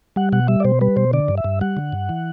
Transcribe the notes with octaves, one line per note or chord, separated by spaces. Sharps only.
G3 F#5
B2 F#5
G3 E5
D5
B2 C5
G3 B4
B2 C5
D3 D5
G2
E5
G2
G3 F#5
D3
G2
E3